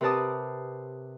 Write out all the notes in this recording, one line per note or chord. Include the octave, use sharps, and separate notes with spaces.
C3 A#4 B4 D5 A5 D#6